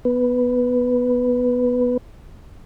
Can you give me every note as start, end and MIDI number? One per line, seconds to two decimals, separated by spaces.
0.05 1.97 59
0.05 1.97 71